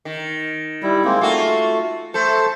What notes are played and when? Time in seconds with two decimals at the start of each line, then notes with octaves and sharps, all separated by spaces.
0.05 D#3
0.83 G3 E4
1.04 G#3 A#3 C4
1.21 A3 F4 F#4
2.14 A3 A4 C5